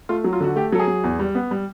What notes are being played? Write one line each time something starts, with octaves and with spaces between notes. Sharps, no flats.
A3 F4
F#3
F4
D3 F#4
A3 G4
F#3 A4
G#4
F#3
E2
G3
B3
G3